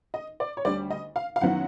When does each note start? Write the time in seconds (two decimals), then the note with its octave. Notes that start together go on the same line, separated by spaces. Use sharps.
0.14 D#5
0.40 D5
0.57 C#5
0.65 D2 D3 G3 D5
0.90 D#5
1.16 F5
1.36 F5
1.41 F#2 D#3 F#3 B3 E4 F#5